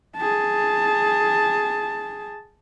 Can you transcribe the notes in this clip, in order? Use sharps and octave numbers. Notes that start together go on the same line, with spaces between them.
G#4 A5